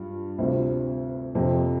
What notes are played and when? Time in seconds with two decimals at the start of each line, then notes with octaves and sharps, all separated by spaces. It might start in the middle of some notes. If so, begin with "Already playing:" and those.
Already playing: G2 F4
0.38 D2 C3 G3 C4 F4
1.35 F2 C3 F3